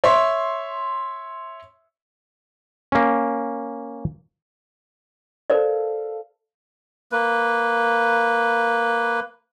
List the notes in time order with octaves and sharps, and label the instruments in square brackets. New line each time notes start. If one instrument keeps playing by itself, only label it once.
[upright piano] C#5 E5 C6
[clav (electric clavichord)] A#3 C#4
[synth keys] A4 F5 [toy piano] A#4 C5 D5
[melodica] A#3 B4